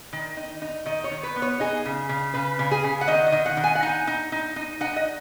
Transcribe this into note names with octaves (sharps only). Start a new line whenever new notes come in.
D#3
D#4
D#4
D#3 D#5
C#5
D#3
B4
B3
C#5
D#4 G#4
C#3
C#3
C#3 B4
C#3
G#4
C#3
F#5
D#3 D#5
D#5
D#3
F#5
D#3
G#5
F#5
D#4 G#5
D#4
D#4
D#4
D#4 F#5
D#5